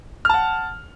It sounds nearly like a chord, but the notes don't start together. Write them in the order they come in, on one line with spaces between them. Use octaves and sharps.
F6 A5 F#5